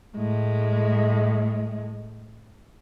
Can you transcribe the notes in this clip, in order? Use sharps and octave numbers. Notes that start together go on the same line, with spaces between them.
A2 G#3